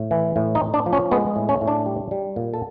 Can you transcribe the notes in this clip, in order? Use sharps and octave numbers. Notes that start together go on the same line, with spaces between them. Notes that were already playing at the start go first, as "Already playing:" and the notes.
Already playing: A2
E3
A2
D#4
A2
D4
F3
C#4
G#3 B3
A2
C#4
A2
D4
G3
G3
A#2
A4